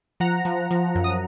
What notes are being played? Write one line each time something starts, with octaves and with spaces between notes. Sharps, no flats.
F3 F#5 A#5
F3
F3
F#2
D#6